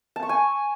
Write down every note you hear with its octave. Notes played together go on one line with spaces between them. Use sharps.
A5
C#6
G#5